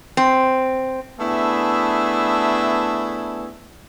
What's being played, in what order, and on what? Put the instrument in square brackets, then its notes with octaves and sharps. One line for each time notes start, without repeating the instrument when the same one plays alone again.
[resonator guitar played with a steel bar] C4
[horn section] A3 B3 D4 E4 G#4 E5